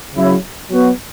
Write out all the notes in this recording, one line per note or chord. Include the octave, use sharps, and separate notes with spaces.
C#3 F#3 E4 C#5
F#3 B3 F#4